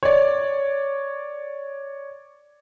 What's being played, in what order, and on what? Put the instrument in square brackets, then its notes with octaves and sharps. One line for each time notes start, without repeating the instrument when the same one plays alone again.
[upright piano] C#5 D5